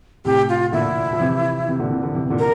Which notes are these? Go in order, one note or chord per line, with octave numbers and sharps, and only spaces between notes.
A2 C3 G4
F4
A#2 D3 E4
F3
C3 E3
C3 E3
A#2 D3
C3 E3
D3 F3
C3 E3
C3
A#2 D3
A#4